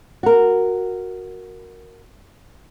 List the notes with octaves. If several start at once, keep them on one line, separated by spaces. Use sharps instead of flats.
F#4 A#4